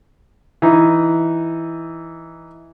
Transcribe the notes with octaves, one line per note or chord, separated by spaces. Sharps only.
E3 D#4